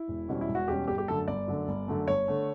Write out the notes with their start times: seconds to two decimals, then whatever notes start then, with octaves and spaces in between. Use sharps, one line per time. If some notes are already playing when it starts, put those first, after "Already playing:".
Already playing: E4
0.08 E1
0.28 E2 B2 G3 C#4
0.41 E4
0.49 E1
0.55 F#4
0.68 E2 B2 G3 C#4 G4
0.88 G1 G4
0.98 G4
1.08 F#2 D3 A3 A4
1.28 G1 D5
1.48 F#2 D3 A3
1.68 G1
1.88 F#2 D3 A3
2.07 G1 C#5
2.28 D3 A3